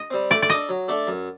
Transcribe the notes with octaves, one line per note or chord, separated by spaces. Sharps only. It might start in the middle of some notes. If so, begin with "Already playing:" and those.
Already playing: D#5
G3 C4
A3 D5
D5
D4 A4 D#5
F#3
A3 D4 A4 D5
F#2